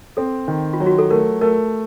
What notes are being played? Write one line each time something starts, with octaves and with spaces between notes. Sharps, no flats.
C4 A4
D#3
F4
F#3
F#4
A4
A3 A#4
A3 A#4